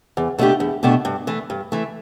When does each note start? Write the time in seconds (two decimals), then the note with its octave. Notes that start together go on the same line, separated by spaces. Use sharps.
0.17 E2
0.38 B2 A3 D4 G4
0.60 E2
0.83 B2 A3 D4 G4
1.05 G2
1.27 E3 A3
1.50 G2
1.72 E3 A3